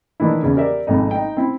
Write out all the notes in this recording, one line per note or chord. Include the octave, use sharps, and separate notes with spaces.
D#3 E3 D4 E4
E2 C#3
G4 A#4 D5 E5
G#1 F2 D#4
D#4 G5
C4 E4